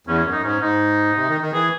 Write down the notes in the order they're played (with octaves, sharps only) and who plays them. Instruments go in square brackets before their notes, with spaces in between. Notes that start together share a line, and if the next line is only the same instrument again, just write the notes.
[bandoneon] E2 [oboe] C#4
[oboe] C#4
[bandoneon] F#2
[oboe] D#4
[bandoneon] G#2 [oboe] C#4
[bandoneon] G#2 [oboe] D#4
[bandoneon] C3
D#3
D#3
[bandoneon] E3 [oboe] G#4